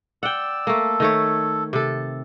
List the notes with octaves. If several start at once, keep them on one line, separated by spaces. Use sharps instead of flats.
D5 F#5 G5 E6
A3 A#3 A4
D#3 A3 C#5
C3 A4